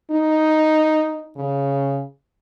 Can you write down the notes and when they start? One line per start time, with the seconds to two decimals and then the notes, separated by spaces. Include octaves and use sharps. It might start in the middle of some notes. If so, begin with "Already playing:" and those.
0.11 D#4
1.36 C#3